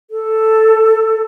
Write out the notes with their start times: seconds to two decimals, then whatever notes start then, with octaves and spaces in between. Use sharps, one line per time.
0.11 A4